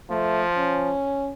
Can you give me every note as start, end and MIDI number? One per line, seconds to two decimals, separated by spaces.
0.10 0.91 53
0.10 0.42 57
0.57 1.32 61